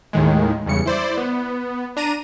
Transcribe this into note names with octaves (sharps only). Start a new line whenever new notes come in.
D#2 A2 D#3 G#3
E2 G2 C#3 C#7
E4 C5 D5
B3
D4 A#5 D#7